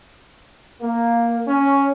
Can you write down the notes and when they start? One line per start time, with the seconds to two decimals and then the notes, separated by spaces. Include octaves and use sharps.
0.82 A#3
1.48 C#4